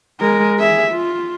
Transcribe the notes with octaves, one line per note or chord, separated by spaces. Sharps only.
G#3 A#4
G#4 E5
F4